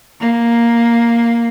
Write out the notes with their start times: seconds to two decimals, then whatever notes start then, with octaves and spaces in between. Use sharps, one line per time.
0.19 A#3